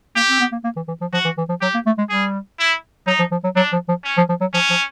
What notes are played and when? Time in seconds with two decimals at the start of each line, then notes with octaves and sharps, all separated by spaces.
0.16 A#3 G4
0.30 C4
0.40 B3
0.52 A#3
0.64 A#3
0.76 E3
0.88 E3
1.01 F3
1.13 F3 F#4
1.25 E3
1.38 E3
1.49 F3
1.61 F#3 G4
1.74 A#3
1.86 A3
1.98 G#3
2.10 G3 G#4
2.59 E4
3.07 F#3 D#4
3.19 F3
3.32 F3
3.44 F#3
3.56 F#3 D4
3.73 F3
3.89 F3
4.04 C#4
4.18 F3
4.29 F3
4.41 F#3
4.54 F3 C#4
4.70 F3